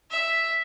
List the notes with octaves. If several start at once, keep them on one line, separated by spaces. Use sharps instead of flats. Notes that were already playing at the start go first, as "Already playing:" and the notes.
E5